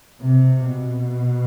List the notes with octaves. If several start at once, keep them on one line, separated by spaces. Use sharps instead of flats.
C3
B2